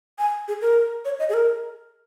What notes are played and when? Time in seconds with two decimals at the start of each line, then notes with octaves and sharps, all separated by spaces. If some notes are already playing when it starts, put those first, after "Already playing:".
0.19 G#5
0.48 G#4
0.61 A#4
1.05 C#5
1.19 D#5
1.29 G#4
1.34 A#4